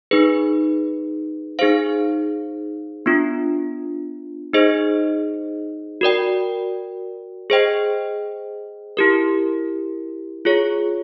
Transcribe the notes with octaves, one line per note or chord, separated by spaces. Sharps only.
D#4 G#4 B4
D#4 G#4 C5 F5
B3 D4 F4
D#4 G#4 C5 D#5
F#4 A#4 D5 G5
G#4 C5 D#5 G5
E4 G4 A#4
F4 G#4 C#5